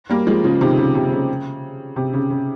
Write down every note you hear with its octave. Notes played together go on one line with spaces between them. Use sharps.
G3 A#3
F3 G#3
C#3 F3
C3 D#3
C#3
C3
C#3
C3
C#3
C#3